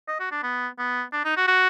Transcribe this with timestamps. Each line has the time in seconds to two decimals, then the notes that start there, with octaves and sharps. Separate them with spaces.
0.08 D#5
0.20 F#4
0.32 D4
0.43 B3
0.79 B3
1.13 D4
1.25 D#4
1.37 F#4
1.48 F#4